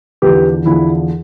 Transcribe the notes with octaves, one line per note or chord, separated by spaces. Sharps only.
E2 D3 F3 G4 B4
E2 D3 F3 E4